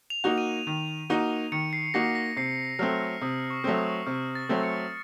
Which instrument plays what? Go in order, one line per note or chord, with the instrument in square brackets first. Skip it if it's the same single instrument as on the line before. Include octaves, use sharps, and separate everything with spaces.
[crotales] F7
[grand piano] A#3 D#4 F#4
[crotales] D#7
[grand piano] D#3
A#3 D#4 F#4
[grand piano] D#3 [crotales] C#7
[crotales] C7
[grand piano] A#3 D#4 F#4 [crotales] A#6
[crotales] A#6
[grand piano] C3 [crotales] C7
[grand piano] F#3 A3 C4 [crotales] F6
[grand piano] C3 [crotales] D#6
[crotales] C#6
[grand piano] F#3 A3 C4
[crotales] D#6
[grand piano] C3 [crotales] F6
[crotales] A6
[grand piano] F#3 A3 C4
[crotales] C#7